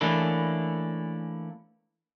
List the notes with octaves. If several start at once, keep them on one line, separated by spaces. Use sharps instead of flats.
E3 A3 A#3 C#4 D4 E4